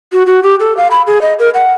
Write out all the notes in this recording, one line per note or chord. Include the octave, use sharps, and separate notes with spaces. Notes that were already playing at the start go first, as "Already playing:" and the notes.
F#4
F#4
G4
A4
F5
B5
G#4
D#5
A#4
F#5